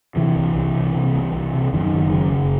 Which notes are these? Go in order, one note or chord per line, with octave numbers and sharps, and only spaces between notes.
C3 E3
C2
C2
C3
C3
C2
C2
C3
F#2 D#3
F#1
C#3
F#1